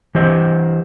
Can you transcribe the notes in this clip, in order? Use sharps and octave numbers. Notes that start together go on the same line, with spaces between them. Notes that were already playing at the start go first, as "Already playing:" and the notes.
E3 G4 C5 D#5